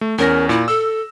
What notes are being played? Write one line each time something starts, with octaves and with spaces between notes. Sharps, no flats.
A3
E2 C#4 A#4 A#6
A#2 E4
A4 E6